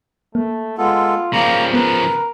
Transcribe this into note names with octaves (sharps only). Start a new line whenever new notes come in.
A3 A#3
G#3 B3 F4 A4
C#3 F3 G3 A#3 A#5
B3 A#4 B4